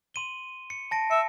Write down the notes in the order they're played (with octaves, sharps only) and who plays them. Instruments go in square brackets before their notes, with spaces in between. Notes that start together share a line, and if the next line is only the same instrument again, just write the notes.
[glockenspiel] C6 D#7 G7
C#7
A5 A#6 D7
[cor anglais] E5 [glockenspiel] C#7